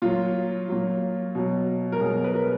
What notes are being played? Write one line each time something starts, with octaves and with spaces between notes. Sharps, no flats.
A#2 F#3 F4
A#2 F#3
B2 F#3
A#4
B2 F#3 G#4
B4
A#4